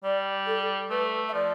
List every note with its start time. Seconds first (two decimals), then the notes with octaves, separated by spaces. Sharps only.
0.04 G3 D5
0.47 A4
0.91 A3 B4
1.29 E5
1.34 F3 D5